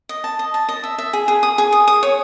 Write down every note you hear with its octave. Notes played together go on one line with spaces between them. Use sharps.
D#5
A5
D#5
A5
D#5
E5
E5
G#4
G#4
D#6
G#4
D#6
D#6
C#5